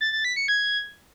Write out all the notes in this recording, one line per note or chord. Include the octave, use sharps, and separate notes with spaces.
A6
A6
B6
C#7
G#6